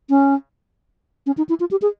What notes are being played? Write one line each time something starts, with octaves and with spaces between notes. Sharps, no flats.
C#4
C#4
D#4
E4
F4
G4
G#4